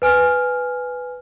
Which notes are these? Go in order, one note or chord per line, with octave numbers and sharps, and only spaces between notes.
B4 G#5 F6